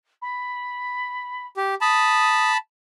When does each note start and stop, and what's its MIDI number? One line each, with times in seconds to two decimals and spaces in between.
0.22 1.46 83
1.57 1.75 67
1.81 2.57 81
1.81 2.57 83
1.81 2.52 87